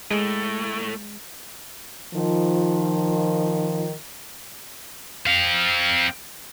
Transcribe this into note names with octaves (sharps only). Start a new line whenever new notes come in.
A2 G#3 A3
D#3 F3
C4 F5